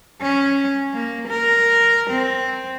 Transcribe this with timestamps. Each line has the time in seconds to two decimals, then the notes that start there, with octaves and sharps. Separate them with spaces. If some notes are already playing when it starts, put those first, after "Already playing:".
0.21 C#4
0.94 A#3
1.28 A#4
2.11 C4